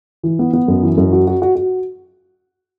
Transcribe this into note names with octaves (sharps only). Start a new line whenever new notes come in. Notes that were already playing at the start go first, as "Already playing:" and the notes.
E3
B3
B3
F#2
E3
F#2
F#4
F#4
F#4
F#4